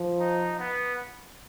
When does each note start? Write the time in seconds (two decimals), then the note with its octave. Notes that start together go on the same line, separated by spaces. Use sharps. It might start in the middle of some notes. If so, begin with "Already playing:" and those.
Already playing: F3
0.20 D#4
0.59 B3